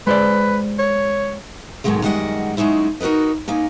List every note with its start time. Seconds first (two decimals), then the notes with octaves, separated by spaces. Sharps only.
0.07 G#3 B4 C5 D5
0.79 C#5
1.84 G#2 B2 D#3 F#3 G#3 A3
2.02 F#2 D#3 G3 G#3 D#5 F#5
2.57 F#3 G#3 C#4 D#4 E4
3.01 D#4 F#4 A#4 B4 D#5
3.48 A#3 C#4 D#4